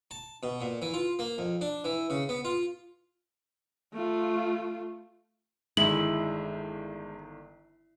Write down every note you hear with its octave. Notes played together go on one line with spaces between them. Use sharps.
A5
B2
A#2
E3
F4
A#3
F2
D4
E3
C#3
B3
F4
A3 F4
G1 D#3 G#3 E4 F#7